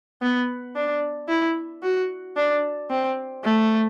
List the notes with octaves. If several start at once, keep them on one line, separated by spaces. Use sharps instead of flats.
B3
D4
E4
F#4
D4
C4
A3